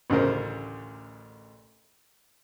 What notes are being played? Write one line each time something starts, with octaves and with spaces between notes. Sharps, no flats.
A1 D2 C#3 A#4 C5